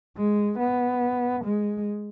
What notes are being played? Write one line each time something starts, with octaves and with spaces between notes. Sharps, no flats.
G#3
B3
G#3